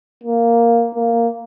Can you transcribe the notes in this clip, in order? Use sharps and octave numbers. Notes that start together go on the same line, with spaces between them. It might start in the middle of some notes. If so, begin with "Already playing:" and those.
A#3
A#3